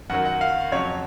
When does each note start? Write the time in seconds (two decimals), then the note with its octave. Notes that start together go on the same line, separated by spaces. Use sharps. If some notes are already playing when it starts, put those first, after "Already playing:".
0.10 F#2 D#3 F#3 F#5
0.26 F#5
0.41 F5
0.72 F2 C#3 F#3 C#5